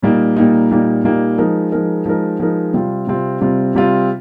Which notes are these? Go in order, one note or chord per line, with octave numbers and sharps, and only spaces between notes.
A#2 G3 A#3 D#4
A#2 G3 A#3 D#4
A#2 G3 A#3 D#4
A#2 G3 A#3 D#4
F3 G#3 D#4 A#4
F3 G#3 D#4 A#4
F3 G#3 D#4 A#4
F3 G#3 D#4 A#4
C3 G3 C4 F4
C3 G3 C4 F4
C3 G3 C4 F4
C3 G3 C4 F4